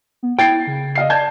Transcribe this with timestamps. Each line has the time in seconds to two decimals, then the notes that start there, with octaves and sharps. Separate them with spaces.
0.23 B3
0.39 E4 G5 G#6 A6 C7
0.67 C#3
0.95 D#5 F5 C7
1.10 D5 A5 G6 G#6